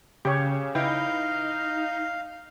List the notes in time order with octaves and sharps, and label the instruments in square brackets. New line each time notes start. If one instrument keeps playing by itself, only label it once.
[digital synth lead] C#3 [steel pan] G4 C#5
[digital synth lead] D#4 [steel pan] E4 B4 G5 [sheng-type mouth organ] F5